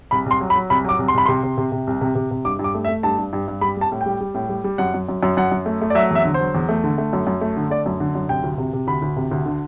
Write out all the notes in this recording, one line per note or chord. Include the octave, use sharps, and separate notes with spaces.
C2 B5
C2 C6
F#3
B5
F#3
C2 B5
F#3 D6
C2
C6
C2 B5
C3 C6
C3
C3
C3
C2
C3
C3
C3
G2 D6
G2
D6
A3
E5
A3
G2 A5
G2
G2
G2
G3 B5
G3 A5
A2
G3 G5
G3
A2
G3
G3
F#2 F#5
F#2
F#2
F#2
F#2 F#5
F#2
A3
A3
D5
F#3 E5
E2 E5
D3
C5
F#3
E2
A3
D3
A3
F#2
F#2
A3
D3
A3 D5
F#2
D3
F#2
C3 G5
D2
C3
C3
D2 B5
D2
C3
D2
D3